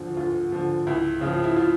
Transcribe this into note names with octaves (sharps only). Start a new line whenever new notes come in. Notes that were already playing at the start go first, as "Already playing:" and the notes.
Already playing: D2 D3 F3
D2 F4
D3 F3
C#2 E4
C#3 F3
E4
F4